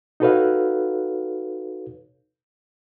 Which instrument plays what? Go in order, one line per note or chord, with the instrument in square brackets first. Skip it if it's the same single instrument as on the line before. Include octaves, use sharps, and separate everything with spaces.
[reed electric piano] D#4 F#4 A4 B4 C#5 F5